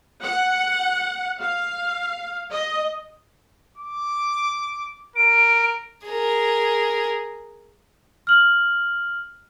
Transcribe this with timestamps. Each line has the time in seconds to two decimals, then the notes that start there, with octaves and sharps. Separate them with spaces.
0.22 F#5
1.39 F5
2.50 D#5
3.78 D6
5.16 A#4 D7
6.06 G#4 A#4
8.27 F6 F#7